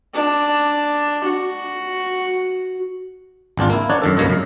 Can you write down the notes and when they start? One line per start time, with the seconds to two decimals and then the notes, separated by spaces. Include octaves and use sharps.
0.14 D4
1.24 F#4
3.57 G#1 E2 D4 F4
3.70 A#3 E4
3.90 D4 D#4 C#5 D5 F#5
4.02 F#2 D#3 A4
4.17 C#2 G2 A#3 C#5 D#5
4.30 F#2